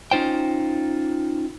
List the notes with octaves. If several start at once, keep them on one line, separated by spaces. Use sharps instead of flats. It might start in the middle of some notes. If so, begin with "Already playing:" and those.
C#4 D#4 F4 C5 G5